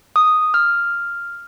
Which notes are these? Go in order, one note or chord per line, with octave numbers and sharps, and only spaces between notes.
D#6
F6